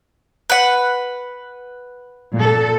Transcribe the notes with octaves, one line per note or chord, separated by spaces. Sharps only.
B4 F#5
A#2 A4